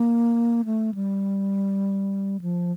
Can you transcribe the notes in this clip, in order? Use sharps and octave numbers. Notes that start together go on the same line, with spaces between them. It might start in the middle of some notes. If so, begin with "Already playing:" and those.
Already playing: A#3
A3
G3
F3